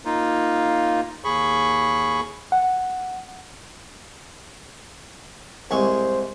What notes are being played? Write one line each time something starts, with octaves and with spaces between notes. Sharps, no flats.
A#3 D#4 F4
D#2 G#4 B5 C#6
F#5
C2 G#3 C5 C#6